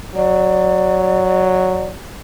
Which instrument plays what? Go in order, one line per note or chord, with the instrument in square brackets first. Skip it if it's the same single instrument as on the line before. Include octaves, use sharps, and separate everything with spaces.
[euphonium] F#3 [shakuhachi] D5